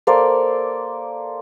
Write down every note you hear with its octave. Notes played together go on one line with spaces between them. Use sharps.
A#3 A4 C5 D5